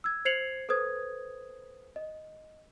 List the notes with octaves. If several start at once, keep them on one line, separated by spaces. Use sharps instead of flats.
E6 G#6
C5 G#6 C7 C#7 F7 F#7
A4 B4 C5 D#6 G#6
D#5